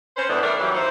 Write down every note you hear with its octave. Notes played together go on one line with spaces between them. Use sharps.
C#4 B4 C5
E2 A2 E3 B3 D4
G3 A3 D4 A#4 D5
E2 G2 E3 F#3
D#4 E4 A4 C5